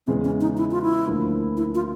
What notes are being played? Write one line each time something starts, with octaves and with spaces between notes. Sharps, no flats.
E2 C#3 E3 G#3 C4
C#4
D#4
E4
F4
E4
D2 D3 F3 A#3
E4
F4